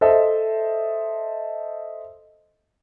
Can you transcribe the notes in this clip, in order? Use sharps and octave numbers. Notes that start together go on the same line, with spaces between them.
A4 C5 D#5 E5 A5